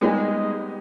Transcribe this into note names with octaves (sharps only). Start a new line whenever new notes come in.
G3 G#3 B3 D#4 G4